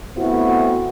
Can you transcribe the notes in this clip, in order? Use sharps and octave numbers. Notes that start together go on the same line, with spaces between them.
A3 B3 C4 E4 F#4